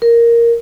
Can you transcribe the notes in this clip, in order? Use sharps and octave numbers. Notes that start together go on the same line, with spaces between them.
A#4